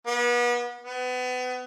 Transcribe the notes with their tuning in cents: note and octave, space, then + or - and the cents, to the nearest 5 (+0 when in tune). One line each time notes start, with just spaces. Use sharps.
B3 -35
B3 +30